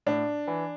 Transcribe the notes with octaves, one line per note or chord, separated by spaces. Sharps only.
A2 D4
E3